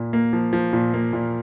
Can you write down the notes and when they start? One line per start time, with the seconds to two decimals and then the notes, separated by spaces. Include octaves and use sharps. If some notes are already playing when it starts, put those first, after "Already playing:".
Already playing: A#2 A#3
0.13 A#3
0.33 F3
0.53 F3
0.73 A#2
0.94 A#3
1.13 A#2